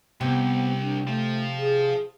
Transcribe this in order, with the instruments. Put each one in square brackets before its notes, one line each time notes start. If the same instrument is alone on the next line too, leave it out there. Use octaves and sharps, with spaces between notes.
[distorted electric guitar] C2 [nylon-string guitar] C3 [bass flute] B3
[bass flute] D4
[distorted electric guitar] F3 F4 [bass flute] A3
[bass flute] G#4